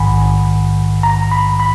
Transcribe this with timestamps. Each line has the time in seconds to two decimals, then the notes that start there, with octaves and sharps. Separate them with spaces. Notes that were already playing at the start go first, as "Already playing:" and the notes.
Already playing: A#1 G#2 D#3 F#5 G#5 B5
1.03 A#5
1.31 B5
1.60 B5